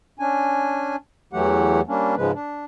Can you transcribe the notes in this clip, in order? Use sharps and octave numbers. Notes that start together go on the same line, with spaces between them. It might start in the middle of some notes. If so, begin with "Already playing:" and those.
C#4 D4 G#5
E2 E3 F#3 A3 G4 F#5
G3 A#3 C#4 D4
G#2 C#3 F3 G#3 B4
D4